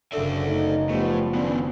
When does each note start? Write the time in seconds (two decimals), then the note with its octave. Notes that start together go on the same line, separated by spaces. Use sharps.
0.13 F#1 D3 A4 D5 E5
0.47 A3 D#4
0.89 A2 F3 G3 B3
1.34 D#3 B3 C#4 D4